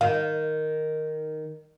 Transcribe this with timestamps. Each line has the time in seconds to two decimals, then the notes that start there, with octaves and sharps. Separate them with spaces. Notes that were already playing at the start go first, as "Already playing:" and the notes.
0.01 D#3 F5